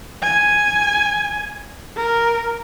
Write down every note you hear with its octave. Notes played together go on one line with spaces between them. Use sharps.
G#5
A#4